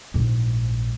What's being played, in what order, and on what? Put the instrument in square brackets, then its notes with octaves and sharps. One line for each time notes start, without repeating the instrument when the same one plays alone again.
[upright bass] A#1 G#2